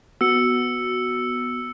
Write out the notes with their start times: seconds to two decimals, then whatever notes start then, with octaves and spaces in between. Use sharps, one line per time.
0.21 B3 F#4 E6 C#7